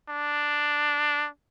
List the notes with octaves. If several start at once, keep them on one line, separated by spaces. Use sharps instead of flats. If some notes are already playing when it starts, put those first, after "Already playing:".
D4